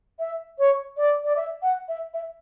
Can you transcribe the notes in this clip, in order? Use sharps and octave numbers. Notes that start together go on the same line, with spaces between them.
E5
C#5
D5
D5
E5
F#5
E5
E5